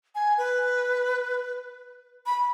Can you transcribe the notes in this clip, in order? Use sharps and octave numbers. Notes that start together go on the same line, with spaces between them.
G#5
B4
B5